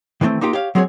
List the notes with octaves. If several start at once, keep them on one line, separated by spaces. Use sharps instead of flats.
D#3 E3 F#3 A3 C4
A#3 D#4 F4 G4
G4 C#5 F5
F#3 G#3 C4 G#4 C5 C#5